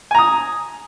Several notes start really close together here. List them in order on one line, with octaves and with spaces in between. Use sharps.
G#5 A#5 D#6